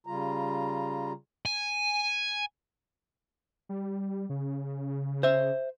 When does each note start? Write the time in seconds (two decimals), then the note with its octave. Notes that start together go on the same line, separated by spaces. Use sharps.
0.07 C#3 G3 F4 A#5
1.45 G#5
3.69 G3
4.30 C#3
5.23 C5 E5